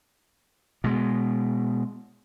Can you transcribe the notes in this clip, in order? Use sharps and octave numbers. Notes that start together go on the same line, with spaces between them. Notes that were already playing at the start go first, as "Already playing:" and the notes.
B2 G#3